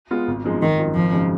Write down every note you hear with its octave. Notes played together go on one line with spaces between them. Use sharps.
G#3 B3 F4
G#1
F#2 F3 G#3 D#4
G#1 D#3
F#2 F3
G#1 F3
F#2 C#3 G#3 D#4